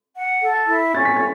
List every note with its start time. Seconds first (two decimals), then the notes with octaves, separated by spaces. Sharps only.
0.15 F#5
0.41 A4
0.67 E4
0.94 C#4 A6
1.05 B6
1.17 A6